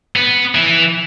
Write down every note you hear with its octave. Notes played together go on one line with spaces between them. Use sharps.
B3
E3